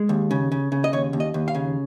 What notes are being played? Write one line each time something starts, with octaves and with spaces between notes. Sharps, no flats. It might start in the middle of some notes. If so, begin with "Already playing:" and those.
Already playing: G#3
D#2
C#3
C#3
C#3
D#5
D#2 C#5
D#2
D#5
D#2
F5
C#3